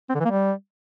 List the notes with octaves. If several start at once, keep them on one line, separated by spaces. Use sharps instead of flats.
C4
D3
E3
A#3
G3